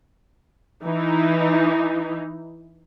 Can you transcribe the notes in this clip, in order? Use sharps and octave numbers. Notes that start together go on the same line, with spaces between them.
E3 D#4